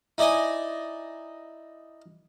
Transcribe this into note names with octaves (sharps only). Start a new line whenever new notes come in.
D#4 E4 D5 D#5 G#5